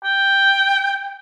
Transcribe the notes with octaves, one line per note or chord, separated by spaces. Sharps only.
G5